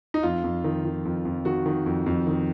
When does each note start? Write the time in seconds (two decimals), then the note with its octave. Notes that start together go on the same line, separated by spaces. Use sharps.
0.14 D#4
0.23 F2 F4
0.44 F2
0.64 D#3
0.84 D#3
1.05 F2
1.25 F2
1.45 D#3 F#4
1.66 D#3
1.86 F2
2.06 F2
2.27 D#3